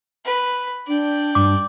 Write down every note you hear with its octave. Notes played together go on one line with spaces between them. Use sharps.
B4
D4 D5 G5
G2 D6